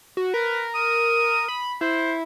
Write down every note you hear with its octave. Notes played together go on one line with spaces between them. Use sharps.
F#4
A#4 B4
D#6
B5
E4 C5